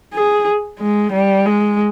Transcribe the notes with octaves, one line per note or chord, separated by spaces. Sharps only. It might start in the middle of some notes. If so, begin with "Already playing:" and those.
G#4
G#3
G3
G#3